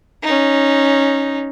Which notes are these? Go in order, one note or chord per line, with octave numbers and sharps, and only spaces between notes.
C#4 D#4